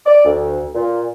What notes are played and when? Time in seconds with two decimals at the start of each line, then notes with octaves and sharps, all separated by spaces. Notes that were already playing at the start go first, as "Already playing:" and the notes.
0.06 D5
0.25 D2
0.75 A#2